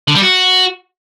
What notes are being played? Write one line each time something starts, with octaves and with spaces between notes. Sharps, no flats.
D3
G3
F#4